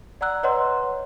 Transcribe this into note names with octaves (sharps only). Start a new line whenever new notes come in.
D5 F#5 A#5 E6 F#6
B4 C#5 D#5 F#5 A#5 C6